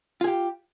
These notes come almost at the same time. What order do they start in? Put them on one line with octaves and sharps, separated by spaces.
F4 G#4 G4